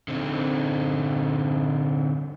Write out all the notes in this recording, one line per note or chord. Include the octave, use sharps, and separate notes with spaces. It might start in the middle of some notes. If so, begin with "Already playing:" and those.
D3 C4 D#4